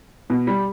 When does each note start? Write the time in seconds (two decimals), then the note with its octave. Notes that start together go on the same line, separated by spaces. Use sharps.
0.30 B2
0.47 G3